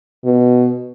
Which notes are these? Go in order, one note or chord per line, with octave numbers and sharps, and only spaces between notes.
B2